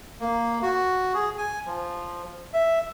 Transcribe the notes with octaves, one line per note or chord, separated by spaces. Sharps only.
A#3
F#4
G#4
G#5
F3
E5